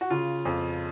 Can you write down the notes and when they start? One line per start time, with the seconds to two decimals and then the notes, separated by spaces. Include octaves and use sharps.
0.01 F#4
0.10 C#3 F4
0.45 F2